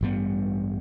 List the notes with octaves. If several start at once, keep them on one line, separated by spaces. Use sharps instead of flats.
A1 G2 G3 B3